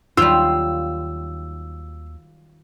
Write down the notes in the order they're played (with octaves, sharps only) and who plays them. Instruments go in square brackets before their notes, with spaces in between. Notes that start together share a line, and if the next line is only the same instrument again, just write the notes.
[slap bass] D#2 [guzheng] D#3 F#3 G3 [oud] F4 [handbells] E6